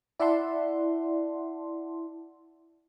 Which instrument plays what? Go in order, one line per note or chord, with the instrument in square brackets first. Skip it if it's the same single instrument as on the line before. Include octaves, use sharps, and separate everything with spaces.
[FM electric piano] E4 D5 E5 F#5 A5 C6